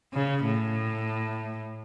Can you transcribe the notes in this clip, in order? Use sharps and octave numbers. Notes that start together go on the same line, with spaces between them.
C#3
A2